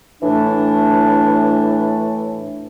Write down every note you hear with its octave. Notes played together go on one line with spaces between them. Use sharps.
A2 E3 A3 D4